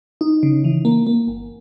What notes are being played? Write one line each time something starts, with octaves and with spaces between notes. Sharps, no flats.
D#4
C#3
E3
A#3
A#3
G1